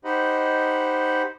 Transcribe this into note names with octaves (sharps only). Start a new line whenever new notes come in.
D#4 G4 C5 D#5 F#5 B5